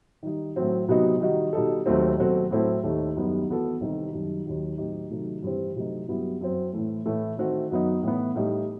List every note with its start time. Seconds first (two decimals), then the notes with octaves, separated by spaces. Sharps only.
0.23 D#3 G3 D#4
0.56 A2 F#3 C4
0.88 C3 F#3 B3 D#4 F#4
1.21 D#3 G3 D#4 F#4
1.53 B2 G3 D#4 A4
1.86 D#2 D#3 F#3 A3 C4
2.18 B2 F#3 C4 F#4 A4
2.51 A2 F#3 C4 E4 A4
2.84 D#2 D#3 A3
3.16 F#2 D#3 G3 B3
3.49 E3 B3 F#4 A4
3.81 C2 C3 D#3
4.13 F#2 D#3 G3
4.45 D#2 D#3 F#3
4.78 A2 F#3 C4 D#4 G4
5.10 C3 D#3 F#3 A3 D#4
5.43 G2 E3 G3 C4
5.76 C3 F#3 A3 D#4
6.08 G2 F#3 B3 E4 G4
6.41 F#2 F#3 C4
6.73 A2 E3 A3
7.06 A2 E3 A3
7.38 D#3 A3 C4 F#4
7.71 F#2 F#3 B3 D#4
8.03 A2 E3 B3
8.35 A2 G3 D#4